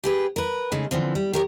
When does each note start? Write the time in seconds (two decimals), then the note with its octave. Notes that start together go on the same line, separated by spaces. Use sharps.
0.04 G4 G#4 B4
0.36 A#4 B4
0.72 C#3 G#3 A3 D#4
0.91 D3 E3 F3 C4
1.15 G3
1.33 G4 A#4 C#5